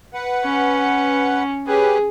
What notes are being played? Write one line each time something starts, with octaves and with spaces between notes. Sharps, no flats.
B4 F#5
C#4
C#4 G4 G#4 B4